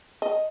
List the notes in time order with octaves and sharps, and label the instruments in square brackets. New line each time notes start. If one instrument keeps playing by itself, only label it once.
[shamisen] D#5